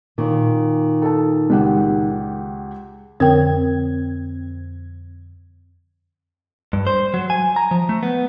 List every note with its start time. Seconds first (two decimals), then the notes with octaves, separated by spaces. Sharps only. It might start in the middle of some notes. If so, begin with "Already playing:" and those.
0.18 A#2 D#3
1.02 A4 A5
1.50 C#2 G4 F#5
3.20 F2 D3 C4 A#4 G5 G#6
6.73 G2
6.87 C5
7.14 F#3
7.30 G#5
7.56 A#5
7.71 F3
7.89 A3
8.03 B3